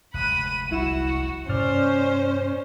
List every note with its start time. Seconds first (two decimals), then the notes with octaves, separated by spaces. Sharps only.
0.14 F1 D2 G#3 B5 F#6 D#7
0.71 C2 E4 F#4 E7
1.49 G2 C3 A#3 C#4 C5 D5 F6